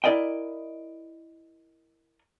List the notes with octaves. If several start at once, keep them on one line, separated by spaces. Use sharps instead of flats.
E4 A#4 D5 D#5 G5